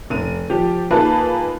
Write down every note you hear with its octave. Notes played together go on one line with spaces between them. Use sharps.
F1 D#7
F3 G4
A#3 D#4 F4 G#4 B4 A5